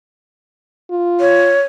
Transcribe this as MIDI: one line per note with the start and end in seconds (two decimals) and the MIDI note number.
0.90 1.57 65
1.20 1.63 73